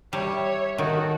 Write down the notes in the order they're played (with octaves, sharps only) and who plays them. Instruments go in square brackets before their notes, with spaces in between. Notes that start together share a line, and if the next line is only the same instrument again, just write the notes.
[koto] G3 [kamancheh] C#5 E5
[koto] D#3 [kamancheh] F#4 A4